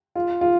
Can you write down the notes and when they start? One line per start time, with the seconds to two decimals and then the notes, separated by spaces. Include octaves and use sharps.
0.16 F4
0.41 F4